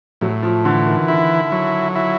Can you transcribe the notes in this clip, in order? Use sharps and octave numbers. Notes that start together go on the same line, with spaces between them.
A2 F#3
F3
D3 E3
D#3
D3 E4
F#3
E4